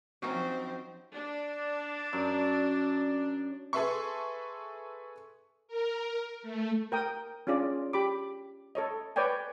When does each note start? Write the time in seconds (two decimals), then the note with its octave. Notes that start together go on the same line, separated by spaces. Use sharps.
0.22 F3 F#3 C4 C#4 D#4
1.14 D4
2.13 F#2
3.73 G#4 A4 B4 E5 C6 C#6
5.68 A#4
6.42 A3
6.92 A#4 G5 D#6
7.47 C#4 D4 F4 G#4 D5
7.93 G4 B5 D6
8.75 A4 C#5 D#5
9.16 B4 C#5 D5 G5 G#5